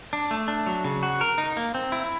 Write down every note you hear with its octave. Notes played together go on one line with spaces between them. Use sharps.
D4
A3
D4
F#3
C#3
F#4
A#4
D#4
A#3
C4
E4